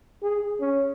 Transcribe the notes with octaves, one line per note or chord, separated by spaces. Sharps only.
G#4
C#4